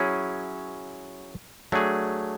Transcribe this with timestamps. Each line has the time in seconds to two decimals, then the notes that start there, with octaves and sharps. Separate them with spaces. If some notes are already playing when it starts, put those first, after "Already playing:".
Already playing: F#3 C#4 E4 G#4
1.72 F#3 A3 D4 G#4